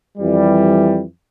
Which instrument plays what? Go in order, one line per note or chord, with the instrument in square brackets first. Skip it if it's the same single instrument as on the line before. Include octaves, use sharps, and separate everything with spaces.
[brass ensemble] F2 E3 G3